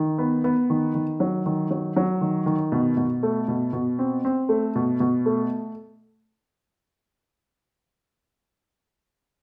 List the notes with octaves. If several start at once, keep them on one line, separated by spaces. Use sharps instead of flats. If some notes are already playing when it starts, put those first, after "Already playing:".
Already playing: D#3
B3
B3
D#3
D#3
F#3
D#3
F#3
F#3
D#3
D#3
B2
B2
A3
B2
B2
C4
C4
A3
B2
B2
A3